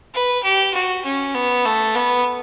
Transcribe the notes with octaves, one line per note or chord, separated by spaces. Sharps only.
B4
G4
F#4
C#4
B3
A3
B3